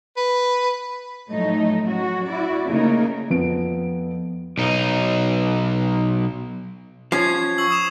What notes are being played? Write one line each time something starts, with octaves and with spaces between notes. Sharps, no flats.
B4
A2 F3 F#3 A3 D#4
F#3 C#4 F#4
E4 F#4 D5
C#3 A3 A#3 D#4 A#4
F2 F3 B3 D7
B1 D#4
F3 C#4 G#6 C7
C#6 E6 F#7
D#6 E7